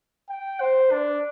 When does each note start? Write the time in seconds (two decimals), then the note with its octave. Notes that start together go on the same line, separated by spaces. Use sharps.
0.29 G5
0.60 C5
0.91 D4